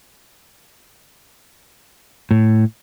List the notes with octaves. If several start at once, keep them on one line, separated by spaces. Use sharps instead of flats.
A2